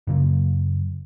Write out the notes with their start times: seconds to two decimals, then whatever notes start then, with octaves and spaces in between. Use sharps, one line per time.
0.07 F#2 C#3 F#3